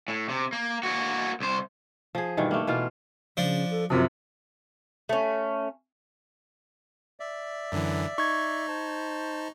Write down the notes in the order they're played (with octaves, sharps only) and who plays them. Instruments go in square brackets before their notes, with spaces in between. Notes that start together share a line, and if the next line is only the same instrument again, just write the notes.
[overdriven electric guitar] A2
C3
A#3
A#3 F#4
C2 C5
[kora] F3 G#4
G2 B2 D#3 E3
A3 A#3
B2 E3 F4
[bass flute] C#3 [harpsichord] F3 D4
[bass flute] A4
[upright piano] F#2 C3 F3 [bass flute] F#4
[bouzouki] A3 C#4
[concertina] D5 E5
[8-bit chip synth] F#2 D3 E3
[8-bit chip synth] D#4 [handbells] C#6 G#6
[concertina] C5 A5